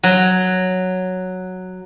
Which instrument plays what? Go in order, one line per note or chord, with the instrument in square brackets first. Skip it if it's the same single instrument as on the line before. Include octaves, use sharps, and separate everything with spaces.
[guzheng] F#3